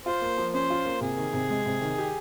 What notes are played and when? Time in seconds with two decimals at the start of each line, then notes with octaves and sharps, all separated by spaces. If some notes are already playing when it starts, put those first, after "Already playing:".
0.05 F4 C5
0.22 A#3
0.38 F3
0.54 C#4 C5
0.70 F4
0.86 A#3
1.01 C3 G#4
1.17 D#3
1.33 C3
1.50 G#3
1.66 C3
1.81 D#3
1.98 G4